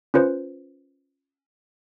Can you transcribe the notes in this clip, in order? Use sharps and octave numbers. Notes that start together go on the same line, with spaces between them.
C#4 F4 B4 C5